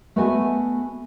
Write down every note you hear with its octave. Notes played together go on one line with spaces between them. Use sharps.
A3 B3 F#4 A4 D#5 G#5